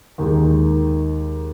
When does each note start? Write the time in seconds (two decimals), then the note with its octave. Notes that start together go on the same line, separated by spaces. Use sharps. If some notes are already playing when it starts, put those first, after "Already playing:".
0.18 D#2 D#3 G#3